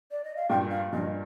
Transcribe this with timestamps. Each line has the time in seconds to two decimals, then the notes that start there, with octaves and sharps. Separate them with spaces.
0.11 D5
0.24 D#5
0.36 F5
0.49 G2 A#2 G5
0.71 F5
0.92 G2 A#2 D#5